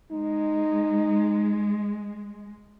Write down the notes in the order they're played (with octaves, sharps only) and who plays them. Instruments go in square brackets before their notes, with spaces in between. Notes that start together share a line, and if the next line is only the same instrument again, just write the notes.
[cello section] G#3 [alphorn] D#4